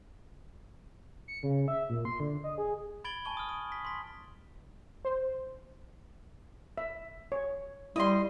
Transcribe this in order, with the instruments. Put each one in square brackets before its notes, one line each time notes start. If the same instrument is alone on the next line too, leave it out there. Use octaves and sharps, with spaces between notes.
[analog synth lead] C#7
C#3
E5
A#2
C6
D3
D#5
G#4
[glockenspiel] B5 G#6 A6 D7 F#7 G7
G#5 A5 C#6 G7
D#6 F6
D#6
B6
C6 B6
[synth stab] C5
[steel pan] E5
C#5
[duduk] G3 [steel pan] E4 [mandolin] D#5 C6